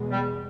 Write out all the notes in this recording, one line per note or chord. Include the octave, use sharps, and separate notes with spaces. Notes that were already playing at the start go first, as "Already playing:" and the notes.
Already playing: E2 B2 G#3 B3
G3